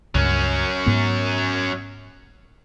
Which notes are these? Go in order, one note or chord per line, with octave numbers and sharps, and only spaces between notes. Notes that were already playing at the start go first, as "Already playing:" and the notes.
C#2 G2 F#3 C#4
G#2 B3